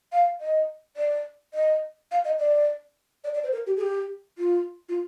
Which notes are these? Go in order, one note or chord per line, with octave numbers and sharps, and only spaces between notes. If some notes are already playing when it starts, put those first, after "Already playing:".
F5
D#5
D5
D#5
F5
D#5
D5
D5
D5
C5
A#4
G4
G#4
G4
F4
F4